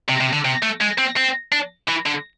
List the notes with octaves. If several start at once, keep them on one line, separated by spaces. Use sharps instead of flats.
C3
C3
D3
C3
A3
G#3
C4
C4
D4
E3
D3